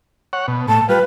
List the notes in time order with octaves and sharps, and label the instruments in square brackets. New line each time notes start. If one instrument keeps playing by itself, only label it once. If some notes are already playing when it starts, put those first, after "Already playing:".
[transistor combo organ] C#5 F#5
B2
[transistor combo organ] A2 [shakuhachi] A5
[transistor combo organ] G3 F4 [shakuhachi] B4